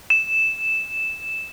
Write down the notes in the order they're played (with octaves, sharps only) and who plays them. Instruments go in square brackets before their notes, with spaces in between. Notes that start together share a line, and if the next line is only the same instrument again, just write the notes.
[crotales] E7